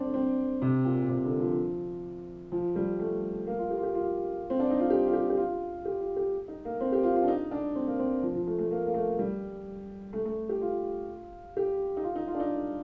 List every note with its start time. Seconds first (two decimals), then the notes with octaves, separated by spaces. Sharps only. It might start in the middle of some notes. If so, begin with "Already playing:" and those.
Already playing: C4 D4
0.14 C4
0.62 C3
0.85 A#2
1.03 A#2
1.09 C3
1.25 D3
1.40 F3
2.52 F3
2.75 G3
2.99 A3
3.47 A#3
3.59 F4
3.71 G4
3.77 F4
3.83 G4
3.95 F4
4.50 C4
4.60 D4
4.70 D#4
4.79 F4
4.90 G4
5.07 F4
5.13 G4
5.30 G4
5.37 F4
5.85 G4
6.00 F4
6.16 G4
6.48 D#4
6.65 A#3
6.81 C4
6.92 G4
7.03 F4
7.16 F4
7.23 D4
7.28 D#4
7.51 D4
7.75 C4
7.87 A#3
7.99 C4
8.23 F3
8.35 F3
8.47 A3
8.58 A3
8.71 A#3
8.87 A#3
8.94 A3
9.19 G3
10.13 A3
10.25 A3
10.49 G4
10.62 F4
11.57 G4
11.97 D#4
12.04 F4
12.15 D#4
12.27 F4
12.35 D4
12.40 D#4